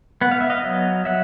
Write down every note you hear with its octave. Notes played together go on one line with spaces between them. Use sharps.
B3 F#5
F5
E5
D#5 F5
F#3
F#3 E5 F#5